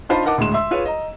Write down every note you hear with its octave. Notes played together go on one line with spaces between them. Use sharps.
D4 D#4 F4 C5 A5 B5
D#4 A#4 D#5 F#5 A5 D6
D2 A2 G#3 C6 E7
E5 C6 E6
F4 G#4 B4 C#5
D#5 A#5